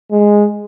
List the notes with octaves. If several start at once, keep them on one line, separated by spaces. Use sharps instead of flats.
G#3